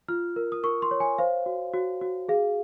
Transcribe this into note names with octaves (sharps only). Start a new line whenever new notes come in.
F4 F6
A#4
D#6
A#4 C#6
C6
C#5
G#5
C5 F5
F#4
F#4
F#4
G#4 F5